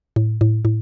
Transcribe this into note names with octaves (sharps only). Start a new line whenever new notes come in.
A2
A2
A2